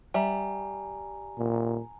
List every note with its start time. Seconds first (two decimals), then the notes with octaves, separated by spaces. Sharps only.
0.14 G3 E5 G#5 A#5
1.38 A#2